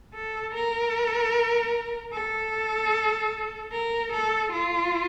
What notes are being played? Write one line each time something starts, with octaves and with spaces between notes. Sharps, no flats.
A4
A#4
A4
A#4
A4
F4